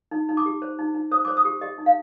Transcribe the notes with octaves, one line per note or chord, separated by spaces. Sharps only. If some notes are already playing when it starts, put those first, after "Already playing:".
D#4
D#4
D6
G4
C5
D#4
D#4
C5 D#6
C5 D6
D#6
G4
G4 D#5
D#4
F5